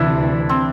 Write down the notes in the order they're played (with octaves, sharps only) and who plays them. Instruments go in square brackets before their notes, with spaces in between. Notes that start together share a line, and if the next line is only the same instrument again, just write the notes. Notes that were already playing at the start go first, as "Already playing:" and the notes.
Already playing: [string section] D2 C3 E3 [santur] D4 E4
[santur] C4